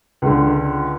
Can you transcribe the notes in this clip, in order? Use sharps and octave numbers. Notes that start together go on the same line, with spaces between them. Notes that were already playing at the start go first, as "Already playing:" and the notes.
C#2 D3